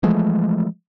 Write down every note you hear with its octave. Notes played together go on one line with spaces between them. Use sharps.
E3 F3 G#3 A3